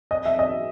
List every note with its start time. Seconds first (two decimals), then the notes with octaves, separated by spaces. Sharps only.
0.11 D#5
0.25 E5
0.39 D#5